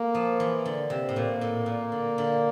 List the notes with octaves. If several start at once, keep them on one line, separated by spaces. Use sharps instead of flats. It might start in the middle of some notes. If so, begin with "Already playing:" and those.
Already playing: A3 A#3
F3
E3
D3
C3
A2
A#2 A#3
A2
A#2
D3
D3